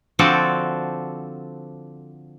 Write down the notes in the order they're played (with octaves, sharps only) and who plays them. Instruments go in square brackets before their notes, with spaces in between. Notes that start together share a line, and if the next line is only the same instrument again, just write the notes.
[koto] D3 F3 C4 F#4 A4 D5